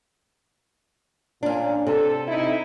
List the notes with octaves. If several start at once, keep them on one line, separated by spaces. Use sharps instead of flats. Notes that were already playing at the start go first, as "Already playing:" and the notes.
A#2 C#4 D4
C3 A4
C4 D#4 E4